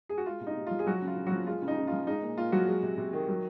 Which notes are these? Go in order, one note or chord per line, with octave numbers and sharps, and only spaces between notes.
G#4
F#4
G#3 F4
C3
D#4
C3
F3 F4
G#4
F#3 G#3 F#4
C#3
F4
C#3
F#3 F#4
F3
G#3 F4
C#3
D#4
C#3
F4
F3
G#3 D#4
A#2
A#2 F4
F3 F#3 F#4
G#3
C3
C3
D#3
F#3